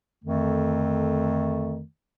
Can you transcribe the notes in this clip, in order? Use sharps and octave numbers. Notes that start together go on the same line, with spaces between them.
F2 D3 D#3 A3